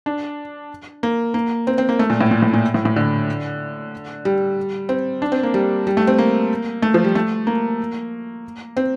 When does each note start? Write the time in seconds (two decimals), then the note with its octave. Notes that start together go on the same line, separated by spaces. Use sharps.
0.06 D4
1.03 A#3
1.34 A#3
1.67 C4
1.78 C4
1.89 A#3
1.99 A3
2.10 A#2
2.21 A2
2.31 A#2
2.42 A2
2.54 A#2
2.74 A2
2.85 A2
2.96 D3
4.25 G3
4.89 C4
5.22 D4
5.32 C4
5.43 A#3
5.54 G3
5.87 G3
5.97 A3
6.07 C4
6.18 A#3
6.82 A3
6.94 F3
7.04 G3
7.15 A3
7.47 A#3
8.77 C4